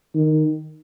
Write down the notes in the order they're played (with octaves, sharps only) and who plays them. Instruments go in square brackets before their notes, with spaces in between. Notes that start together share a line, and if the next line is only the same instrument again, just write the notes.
[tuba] D#3